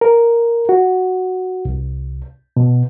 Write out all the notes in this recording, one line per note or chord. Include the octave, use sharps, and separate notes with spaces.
A#4
F#4
C2
B2